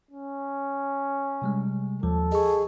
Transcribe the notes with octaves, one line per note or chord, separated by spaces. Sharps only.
C#4
C3 G3 G#3
D#2 F3 A4
G#4 D#5 C#6